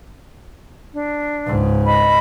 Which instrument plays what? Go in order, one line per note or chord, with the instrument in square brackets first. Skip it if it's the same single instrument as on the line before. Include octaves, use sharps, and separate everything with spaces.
[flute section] D4
[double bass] C#2 G#2
[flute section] D#5 B5